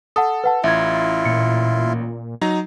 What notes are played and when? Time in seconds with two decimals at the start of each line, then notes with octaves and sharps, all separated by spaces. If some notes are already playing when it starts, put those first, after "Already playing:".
0.16 A4 F#5 A5 D#6
0.44 B4 F#5 A5
0.64 A1 E4 F4 E5 G#6
1.25 A#2 C#7
2.41 F#3 D#4 A#5